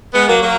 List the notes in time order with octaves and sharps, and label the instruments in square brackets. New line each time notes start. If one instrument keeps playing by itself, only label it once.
[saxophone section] G#3 B3
F#3 A#3
F#3 A#3